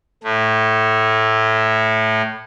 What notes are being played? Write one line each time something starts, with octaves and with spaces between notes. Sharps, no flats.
A2 A3